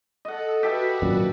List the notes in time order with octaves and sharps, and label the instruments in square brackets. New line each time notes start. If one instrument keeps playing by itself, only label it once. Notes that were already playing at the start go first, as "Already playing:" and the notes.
[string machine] A4 [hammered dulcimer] D#5 F#5
[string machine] F#4 B4 [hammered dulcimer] G4 A4 E5
[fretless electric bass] G#1 F#2 A#2